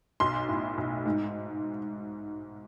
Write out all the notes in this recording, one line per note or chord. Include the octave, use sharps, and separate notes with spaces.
B1 C6
A2
B1
G#2